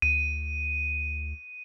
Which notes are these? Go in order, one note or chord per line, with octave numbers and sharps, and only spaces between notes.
D2 D#7